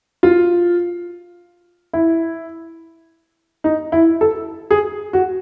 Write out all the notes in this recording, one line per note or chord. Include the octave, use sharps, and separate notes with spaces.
F4
E4
D#4
E4
A4
G#4
F#4